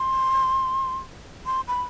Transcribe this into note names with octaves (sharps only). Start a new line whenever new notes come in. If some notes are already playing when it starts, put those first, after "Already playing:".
Already playing: C6
C6
B5